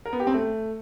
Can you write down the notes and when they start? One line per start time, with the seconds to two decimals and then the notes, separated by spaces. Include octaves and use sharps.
0.05 A#4
0.13 B3
0.20 G4
0.27 C4
0.34 A3